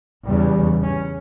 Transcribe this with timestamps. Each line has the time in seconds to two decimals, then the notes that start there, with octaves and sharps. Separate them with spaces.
0.25 E2 C#3 G3
0.82 C#4